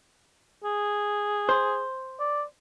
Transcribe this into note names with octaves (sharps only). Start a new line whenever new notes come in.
G#4
C5
D5